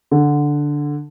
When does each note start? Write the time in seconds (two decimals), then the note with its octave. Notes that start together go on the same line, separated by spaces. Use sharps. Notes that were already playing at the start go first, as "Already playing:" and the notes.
0.11 D3